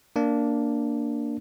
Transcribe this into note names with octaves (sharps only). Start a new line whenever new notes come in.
A#3 D4